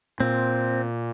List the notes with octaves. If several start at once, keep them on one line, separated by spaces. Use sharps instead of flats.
A#2 C4